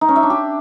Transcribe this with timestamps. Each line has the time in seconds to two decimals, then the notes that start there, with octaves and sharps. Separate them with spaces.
0.01 D#4
0.09 C#4
0.16 E5
0.23 D4
0.30 G4